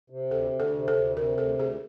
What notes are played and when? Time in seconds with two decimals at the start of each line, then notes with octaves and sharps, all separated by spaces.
0.10 C3
0.31 D2 A4
0.52 D2
0.60 A4
0.74 C3
0.88 A4
0.95 D2
1.16 C3 A#4
1.38 D2 A4
1.58 D2 G#4